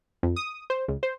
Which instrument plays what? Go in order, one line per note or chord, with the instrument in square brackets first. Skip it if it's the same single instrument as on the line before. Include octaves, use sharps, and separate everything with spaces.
[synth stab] F2
D#6
C5
C#2
C5